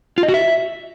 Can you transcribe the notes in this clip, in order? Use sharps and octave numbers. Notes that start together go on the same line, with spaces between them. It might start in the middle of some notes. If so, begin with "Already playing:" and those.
F4
D#5
F#4
E5